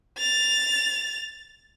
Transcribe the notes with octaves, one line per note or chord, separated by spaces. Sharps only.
A6 F7